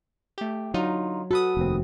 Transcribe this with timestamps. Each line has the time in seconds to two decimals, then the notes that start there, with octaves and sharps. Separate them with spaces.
0.38 A3 G4
0.74 D3 F#3 D#4 F4
1.31 F#4 A4 B4 D#6
1.57 F1 D#2 C4